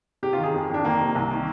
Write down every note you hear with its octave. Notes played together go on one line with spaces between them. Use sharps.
C3 G4
F4
D#3
G#4
F2
F2
D4
D#3 A#3
C3
C2
D#3